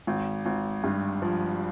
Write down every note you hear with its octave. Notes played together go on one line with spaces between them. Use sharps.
G#1
G#1
G2
F3